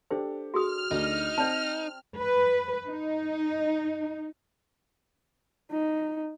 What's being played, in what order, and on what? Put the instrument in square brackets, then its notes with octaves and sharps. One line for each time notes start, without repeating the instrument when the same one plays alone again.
[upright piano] D4 G4 A4 [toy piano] C5
[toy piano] F#4 G#4 D#6 [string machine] F6
[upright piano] D2 D4 [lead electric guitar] D#4
[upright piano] C4 [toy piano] D5 A5
[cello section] B4
D#4
[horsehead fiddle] D#4